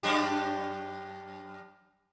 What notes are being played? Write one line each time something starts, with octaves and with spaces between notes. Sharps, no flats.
F#2 D4 G4